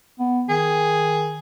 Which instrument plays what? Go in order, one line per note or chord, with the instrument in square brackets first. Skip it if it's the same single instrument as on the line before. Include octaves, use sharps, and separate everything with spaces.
[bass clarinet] B3
[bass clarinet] D#3 [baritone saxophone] G#4